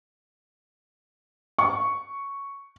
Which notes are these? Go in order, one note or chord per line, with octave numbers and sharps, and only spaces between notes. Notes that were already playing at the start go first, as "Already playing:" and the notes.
C#6